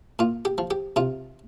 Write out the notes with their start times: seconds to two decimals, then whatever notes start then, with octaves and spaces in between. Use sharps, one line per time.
0.19 A#2 F4
0.45 G4
0.58 F3
0.71 G4
0.96 C3 F4